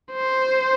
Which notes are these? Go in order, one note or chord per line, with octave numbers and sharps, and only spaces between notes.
C5